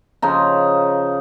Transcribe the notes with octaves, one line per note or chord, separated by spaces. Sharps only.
C#3 F3 D#4